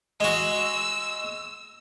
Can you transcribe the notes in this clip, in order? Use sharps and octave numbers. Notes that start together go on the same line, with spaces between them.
G#3 F#4 E6